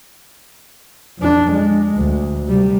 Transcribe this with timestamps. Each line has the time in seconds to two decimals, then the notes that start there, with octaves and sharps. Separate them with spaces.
1.19 F2 D4
1.52 G#3
1.96 D2
2.48 C3 G3